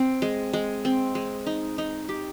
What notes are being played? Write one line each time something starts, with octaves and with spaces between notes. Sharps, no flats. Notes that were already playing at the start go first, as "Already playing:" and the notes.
Already playing: C4
G#3
G#3
C4
G#3
D#4
D#4
G4